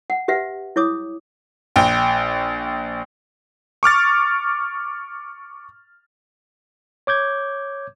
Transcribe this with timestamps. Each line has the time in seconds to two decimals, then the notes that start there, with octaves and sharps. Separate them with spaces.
0.10 F#5
0.28 G4 B4 E5 F#5
0.76 E4 C#5 D6 D#6
1.76 A#1 G5
3.83 C#6 D6 F6 A6
7.07 C#5 D6 G6 G#6